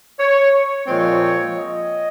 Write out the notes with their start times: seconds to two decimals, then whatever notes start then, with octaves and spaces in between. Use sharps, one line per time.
0.20 C#5
0.87 A#2 F3 G#3 C4 C#5
1.56 D#5